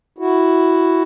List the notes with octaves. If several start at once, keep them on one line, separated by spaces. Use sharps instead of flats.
E4 F#4